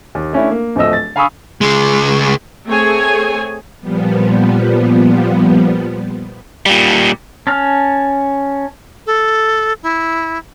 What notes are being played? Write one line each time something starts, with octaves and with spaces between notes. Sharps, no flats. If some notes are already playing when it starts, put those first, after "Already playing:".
D#2
A3 C#4 D4 E4
A#3
D1 F3 A3 D#5 E6
A6
F5 G#5 B5 C#6 D#6 E6
C#2 G#3
A3 C4 G#4 C#5 G#5
A#2 F3 G3 B3
A#2 G3
C#4 A5 F6
A4
E4